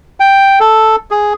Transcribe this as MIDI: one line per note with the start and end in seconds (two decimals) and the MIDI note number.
0.20 0.59 79
0.60 0.96 69
1.11 1.33 68